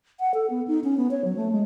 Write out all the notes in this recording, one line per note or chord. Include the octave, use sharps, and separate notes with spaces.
F#5
A4
B3
D#4
C#4
B3
C#5
F#3
A3
G#3